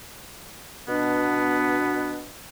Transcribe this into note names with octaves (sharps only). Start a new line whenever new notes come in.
B2 B3 D4